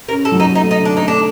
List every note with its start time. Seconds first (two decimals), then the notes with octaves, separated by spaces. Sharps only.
0.08 C#4 A#4
0.25 A4
0.32 F#3
0.40 D#4
0.55 A3 D#4
0.71 D#4
0.78 D3
0.85 D4
0.97 A3 D#4
1.08 D4